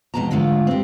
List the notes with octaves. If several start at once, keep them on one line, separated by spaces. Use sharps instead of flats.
F2 B2 G#3 A5 A#5
G#2 D3 G#3 A3 F4
C4 G4